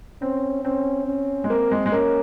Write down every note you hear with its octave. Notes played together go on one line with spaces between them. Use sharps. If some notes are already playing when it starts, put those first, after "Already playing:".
C4 C#4
C4 C#4
C#4
G#3
A#3 C4
G#3
G#3
A#3 C#4